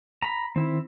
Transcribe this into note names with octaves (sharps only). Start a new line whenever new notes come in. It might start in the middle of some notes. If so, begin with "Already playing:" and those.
A#5 B5
D#3 C4 E4